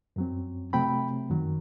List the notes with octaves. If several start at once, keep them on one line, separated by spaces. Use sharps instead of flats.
F#2 F#3 C4
C3 F#3 A3 C4 G5 B5
F#2 D#3 F#3